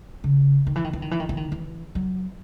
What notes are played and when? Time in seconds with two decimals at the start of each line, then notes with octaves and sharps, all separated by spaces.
0.24 C#3
0.67 D#3
0.76 E3
0.84 D#3
0.93 E3
1.02 D#3
1.11 E3
1.20 D#3
1.29 E3
1.37 D#3
1.52 E3
1.95 F#3